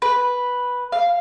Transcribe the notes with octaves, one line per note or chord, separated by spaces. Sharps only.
B4
F5